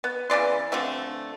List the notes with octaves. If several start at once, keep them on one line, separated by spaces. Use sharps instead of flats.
B3
C#3 E3 D5 C6
D3 F3 A3 C4